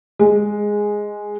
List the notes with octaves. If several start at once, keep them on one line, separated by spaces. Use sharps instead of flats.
G#3